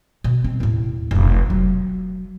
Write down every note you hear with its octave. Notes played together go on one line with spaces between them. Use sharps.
B2
C4
D#2 A2
F1 B1
F#3